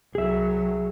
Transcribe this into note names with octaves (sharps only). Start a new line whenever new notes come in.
C2 F#3 G#4 E5